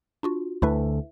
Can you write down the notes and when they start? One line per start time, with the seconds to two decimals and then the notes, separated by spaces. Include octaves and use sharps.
0.23 D4 F4 F#4
0.62 D2 D3 A3 E4 B4 E5